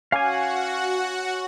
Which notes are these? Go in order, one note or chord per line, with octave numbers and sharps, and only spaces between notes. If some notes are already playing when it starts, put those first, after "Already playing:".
C#4 F#4 C#5 F5 F#5 G#5 D6